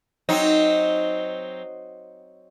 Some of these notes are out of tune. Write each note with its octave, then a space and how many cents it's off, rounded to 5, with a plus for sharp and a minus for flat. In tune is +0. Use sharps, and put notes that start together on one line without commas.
F#3 +0 C4 +0 D#4 +0